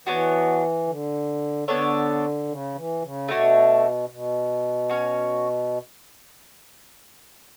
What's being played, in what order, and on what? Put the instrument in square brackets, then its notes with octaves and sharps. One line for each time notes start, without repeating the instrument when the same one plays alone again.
[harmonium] E3 [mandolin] B3 D4 F#4 C#5
[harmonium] D3
[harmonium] D3 [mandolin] B3 D4 A4 C#5
[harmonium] C#3
E3
C#3
[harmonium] B2 [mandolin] A3 D4 F#4 C#5
[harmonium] B2
[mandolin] C#4 F#4 C#5